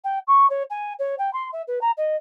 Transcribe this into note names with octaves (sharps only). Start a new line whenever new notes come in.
G5
C#6
C#5
G#5
C#5
G5
C6
E5
B4
A#5
D#5